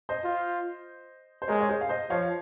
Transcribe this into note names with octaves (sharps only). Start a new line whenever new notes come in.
C5 D#5
F4
C5
G#3 A#4 C#5
C#5
G#4 C5
F5
C5 D#5
F3 C#5 F5